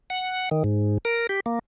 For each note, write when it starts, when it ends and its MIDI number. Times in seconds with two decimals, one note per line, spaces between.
0.10 0.49 78
0.51 0.63 51
0.64 0.98 44
1.05 1.27 70
1.29 1.40 67
1.46 1.59 58